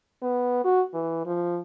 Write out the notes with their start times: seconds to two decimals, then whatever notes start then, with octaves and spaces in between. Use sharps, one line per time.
0.22 B3
0.65 F#4
0.94 E3
1.25 F3